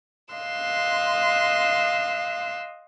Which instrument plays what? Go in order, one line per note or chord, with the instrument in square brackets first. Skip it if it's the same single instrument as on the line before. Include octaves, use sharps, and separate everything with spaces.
[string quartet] D#5 F5 C6 E6 F#6